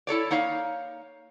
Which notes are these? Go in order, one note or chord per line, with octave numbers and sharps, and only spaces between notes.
E4 A4 C#5 D5
A#3 D#4 C#5 F5